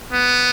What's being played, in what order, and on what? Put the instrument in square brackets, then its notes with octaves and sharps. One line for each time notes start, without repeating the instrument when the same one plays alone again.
[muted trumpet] B3